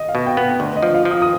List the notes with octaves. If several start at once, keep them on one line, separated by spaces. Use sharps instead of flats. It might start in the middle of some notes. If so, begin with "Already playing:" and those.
Already playing: D#5
F5
B2
G5
B3
D2
D#5
F3
F5
F3
D#6
D#6